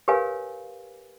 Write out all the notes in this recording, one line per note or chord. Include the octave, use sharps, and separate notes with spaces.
G4 A#4 B4 C#5 F5 G#5